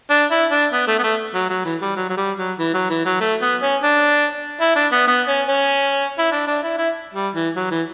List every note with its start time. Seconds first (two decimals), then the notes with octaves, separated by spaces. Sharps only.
0.10 D4
0.31 E4
0.51 D4
0.72 B3
0.87 A3
0.99 B3
1.03 A3
1.34 F#3
1.50 F#3
1.65 E3
1.81 G3
1.96 F#3
2.09 F#3
2.17 G3
2.38 F#3
2.58 E3
2.74 F#3
2.90 E3
3.05 F#3
3.20 A3
3.41 B3
3.62 C#4
3.83 D4
4.61 E4
4.76 D4
4.92 B3
5.07 B3
5.28 C#4
5.48 C#4
6.18 E4
6.32 D4
6.47 D4
6.63 E4
6.78 E4
7.14 G3
7.35 E3
7.56 F#3
7.71 E3